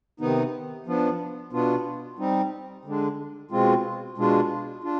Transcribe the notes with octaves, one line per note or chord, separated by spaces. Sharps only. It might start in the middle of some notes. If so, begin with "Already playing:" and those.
C3 D#3 B3 D#4
F3 B3 D4
B2 B3 D4 F4
G3 C4 D#4
D3 G#3 D4
B2 G#3 C4 F4
B2 G#3 D4 F4
D4 F4